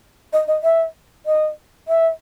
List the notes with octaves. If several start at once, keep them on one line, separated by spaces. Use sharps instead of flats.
D#5
D#5
E5
D#5
E5